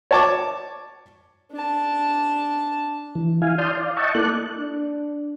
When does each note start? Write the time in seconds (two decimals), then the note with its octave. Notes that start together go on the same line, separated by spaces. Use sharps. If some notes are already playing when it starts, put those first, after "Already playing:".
0.11 C#5 A5 D6
1.52 D4 A5
3.15 E3
3.42 E4 F5 G#5
3.58 D5 A5 C6 D#6 F6 G6
3.77 D5 F5
3.97 D#5 E5 F#5 G5 A5 C#6
4.15 A#3 E4 A4 D5 F#6
4.58 D4